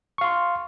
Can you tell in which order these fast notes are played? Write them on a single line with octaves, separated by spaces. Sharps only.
C#6 F5 C6